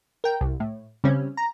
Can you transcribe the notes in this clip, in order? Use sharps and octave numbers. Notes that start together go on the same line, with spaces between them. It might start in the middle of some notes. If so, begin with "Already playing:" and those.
A#4 G5
C2
A2
C#3 G3 C4 C#4
A#5